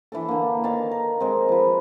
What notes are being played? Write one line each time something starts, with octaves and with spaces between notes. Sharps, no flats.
E3 D4 A4
D3 A#3
D#3 A4 F5 A5
A#4
G#3 C4
F3 B4